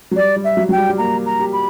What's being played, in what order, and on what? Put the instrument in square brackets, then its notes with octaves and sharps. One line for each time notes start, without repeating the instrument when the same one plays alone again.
[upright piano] F#3
[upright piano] G3 [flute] D5
[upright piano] G3
[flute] E5
[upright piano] F#3
[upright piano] F#3 [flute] G5
[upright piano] G3
G3
[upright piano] A#3 [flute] A#5
[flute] A#5
[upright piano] G4
[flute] B5